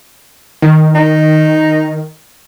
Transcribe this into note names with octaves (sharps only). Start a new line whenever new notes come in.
D#3
D#4